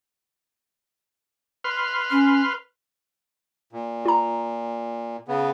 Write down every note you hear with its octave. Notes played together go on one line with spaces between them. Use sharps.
B4 C6 F6
C#4
A#2
F4 A#5
C#3 B3